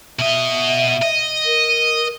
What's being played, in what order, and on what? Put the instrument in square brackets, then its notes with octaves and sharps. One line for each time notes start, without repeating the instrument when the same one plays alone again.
[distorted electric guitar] B2 D#5 [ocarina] E5
[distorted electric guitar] D#5
[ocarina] A#4